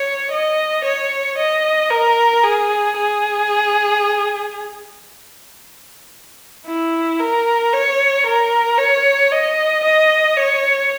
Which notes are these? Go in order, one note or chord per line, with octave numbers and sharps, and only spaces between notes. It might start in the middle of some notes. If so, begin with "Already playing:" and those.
Already playing: C#5
D#5
C#5
D#5
A#4
G#4
G#4
E4
A#4
C#5
A#4
C#5
D#5
D#5
C#5